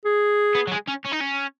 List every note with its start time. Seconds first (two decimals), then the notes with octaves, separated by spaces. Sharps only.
0.05 G#4
0.55 B3
0.67 F#3
0.72 G#3
0.88 C#4
1.06 C#4
1.13 D#4
1.21 C#4